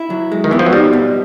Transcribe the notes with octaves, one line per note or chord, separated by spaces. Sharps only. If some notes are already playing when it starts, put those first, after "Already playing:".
Already playing: E4
F#3
G#3
D#3
E3 B3
F3
F#3
G3 D#4
B2